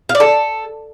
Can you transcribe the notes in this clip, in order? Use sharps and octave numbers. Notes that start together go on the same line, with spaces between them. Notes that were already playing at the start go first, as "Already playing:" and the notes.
F5
D5
A4